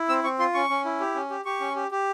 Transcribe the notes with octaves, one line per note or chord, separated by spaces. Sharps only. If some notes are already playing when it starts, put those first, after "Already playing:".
Already playing: E4
C4 E6
C4 C#6
F4 C6
C#4 C#6
C#4
E4
G4
C#4
G4
G4 C#6
C#4
G4
G4